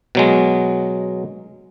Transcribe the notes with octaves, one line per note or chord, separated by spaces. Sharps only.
B2 F#3 G#3